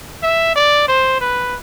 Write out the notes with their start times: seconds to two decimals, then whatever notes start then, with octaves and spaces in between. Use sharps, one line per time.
0.23 E5
0.56 D5
0.88 C5
1.21 B4